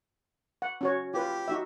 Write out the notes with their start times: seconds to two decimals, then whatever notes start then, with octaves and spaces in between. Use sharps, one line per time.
0.62 F#5
0.81 C#4 F#4 C#5
1.14 F4 G4 B4
1.48 D#4 F#4 E5